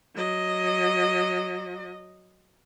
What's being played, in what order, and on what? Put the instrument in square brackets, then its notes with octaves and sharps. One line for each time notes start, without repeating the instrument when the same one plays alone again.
[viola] F#3 D#5